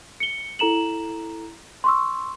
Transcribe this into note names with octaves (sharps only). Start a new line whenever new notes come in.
C#7 G7
E4 A4 A#5 E7 F#7
C6 C#6 E6